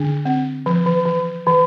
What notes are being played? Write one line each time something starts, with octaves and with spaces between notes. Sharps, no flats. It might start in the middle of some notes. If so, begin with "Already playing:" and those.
Already playing: D3 D4
C4
F3
E3
E3
E3